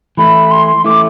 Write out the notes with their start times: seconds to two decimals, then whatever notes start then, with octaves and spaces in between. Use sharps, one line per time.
0.17 E3 A3 E4 B5
0.51 C6
0.84 E3 A3 E4 D6